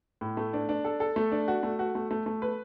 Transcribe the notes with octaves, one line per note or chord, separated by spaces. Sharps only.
A2
A3
D4
D4
A4
A4
A3
D4
F#4
A3
F#4
A3
A3
A3
B4